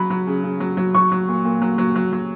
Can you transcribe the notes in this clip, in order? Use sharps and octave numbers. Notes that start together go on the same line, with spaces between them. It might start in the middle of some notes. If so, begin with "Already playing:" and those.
Already playing: F#3 B5
F#3
C#3
C#3
F#3
F#3
F#3 C#6
F#3
A#2
A#2
F#3
F#3
F#3
F#3